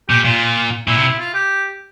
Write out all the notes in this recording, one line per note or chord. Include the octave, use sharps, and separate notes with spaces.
A#2 G4
A#2 F4
A#2 E4
C3
E4
F4
G4